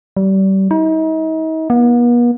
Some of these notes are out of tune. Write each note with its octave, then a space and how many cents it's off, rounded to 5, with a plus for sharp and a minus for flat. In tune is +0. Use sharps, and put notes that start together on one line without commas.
G3 -30
D#4 +40
B3 -45